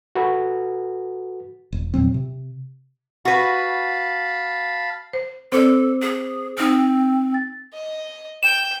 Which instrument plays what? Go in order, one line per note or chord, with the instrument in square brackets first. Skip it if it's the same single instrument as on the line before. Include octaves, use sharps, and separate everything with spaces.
[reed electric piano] F#4 A4 B4
[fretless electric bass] E1
E2 A#2 F#3 C4
C3
[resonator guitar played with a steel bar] F#4 B4 [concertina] F5 A5 B5
[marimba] C5
[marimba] C4 D5 [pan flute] A4 [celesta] C5 D6
[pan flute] G#4
[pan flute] C4 [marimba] D#4 F6
[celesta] A6
[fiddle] D#5
[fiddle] G5 [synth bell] E7